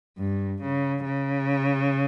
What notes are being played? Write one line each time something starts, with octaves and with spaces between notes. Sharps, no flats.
G2
C#3
C#3